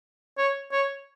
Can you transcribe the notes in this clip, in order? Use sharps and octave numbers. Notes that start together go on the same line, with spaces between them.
C#5
C#5